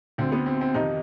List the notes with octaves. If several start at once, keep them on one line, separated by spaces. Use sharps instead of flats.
D2 D3 C4
B3
C4
C4
F2 C3 D#3 D#4